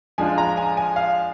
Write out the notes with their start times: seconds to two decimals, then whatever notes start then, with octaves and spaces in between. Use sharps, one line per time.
0.18 F3 G#3 D4 F4 G#5
0.38 A#5
0.57 G#5
0.77 G#5
0.96 F5